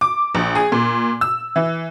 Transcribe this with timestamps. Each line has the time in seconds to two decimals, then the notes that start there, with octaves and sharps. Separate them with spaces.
0.01 D6
0.35 A#1
0.55 G#4
0.72 A#2
1.21 E6
1.56 E3